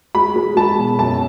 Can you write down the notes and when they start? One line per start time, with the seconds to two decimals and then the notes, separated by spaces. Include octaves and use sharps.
0.15 G#3 B5
0.36 G#3
0.57 G#3 A5
0.78 B2
0.99 F#2 A5